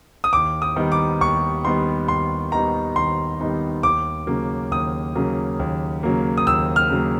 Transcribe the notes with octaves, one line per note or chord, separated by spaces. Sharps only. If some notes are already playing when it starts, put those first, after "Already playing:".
D#6
D#2 D6
D#6
D#3 G3 B3 D#4
D6
D#2 C#6
D#3 G3 B3 D#4 C6
D#2 C6
D#3 G3 B3 D#4 A#5
D#2 C6
D#3 G3 B3 D#4
D#2 D6
C#3 F#3 A#3
D#2 D#6
C#3 F#3 A#3
D#2
C#3 F#3 A#3
D#6
D#2 E6
F6
C#3 F#3 A#3